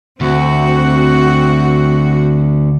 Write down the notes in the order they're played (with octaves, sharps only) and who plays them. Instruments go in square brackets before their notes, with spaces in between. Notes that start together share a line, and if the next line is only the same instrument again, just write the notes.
[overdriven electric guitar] D2 [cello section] C4 F#4